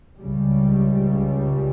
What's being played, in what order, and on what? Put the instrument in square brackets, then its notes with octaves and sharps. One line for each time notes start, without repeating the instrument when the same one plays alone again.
[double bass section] C#2 C#3 G3